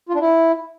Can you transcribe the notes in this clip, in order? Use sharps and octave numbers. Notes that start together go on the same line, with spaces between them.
F4
D4
E4